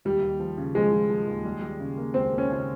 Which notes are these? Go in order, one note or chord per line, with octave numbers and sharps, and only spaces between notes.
D#2 G3
D#2
F3
C#3
F3 G#3
F3
F3
D#2
G3
G3
C#3
A#3
C#2 C4
A#3
C#4
C#3 C#4